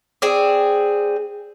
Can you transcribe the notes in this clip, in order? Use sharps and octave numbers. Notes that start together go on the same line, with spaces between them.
C4 G#4 D5